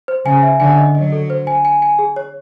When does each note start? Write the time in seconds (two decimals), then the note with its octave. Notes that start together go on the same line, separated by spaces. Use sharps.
0.08 C5
0.25 C#3 G#5
0.43 E5
0.60 D3 G#5
0.78 D#5
0.95 F#3 D#5
1.12 A4
1.30 C5
1.47 G#5
1.65 G#5
1.82 G#5
1.99 G#4
2.16 C#5